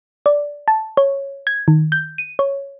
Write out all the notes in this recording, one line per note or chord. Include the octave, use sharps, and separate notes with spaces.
D5
A5
C#5
G#6
D#3
G6
D#7
C#5